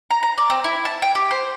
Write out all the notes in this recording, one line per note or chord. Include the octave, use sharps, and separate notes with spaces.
A#5
A#5
D5
C4
E4
A5
G5
G4
C5